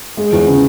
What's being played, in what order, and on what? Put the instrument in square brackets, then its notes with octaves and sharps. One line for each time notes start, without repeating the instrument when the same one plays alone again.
[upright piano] G#3
E2
C#3